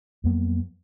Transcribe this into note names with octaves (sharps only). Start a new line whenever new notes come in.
F2 F#3 A#3 B3